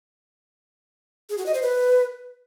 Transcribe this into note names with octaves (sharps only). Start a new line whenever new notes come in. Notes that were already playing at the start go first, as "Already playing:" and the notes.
G#4
F#4
D#5
C5
B4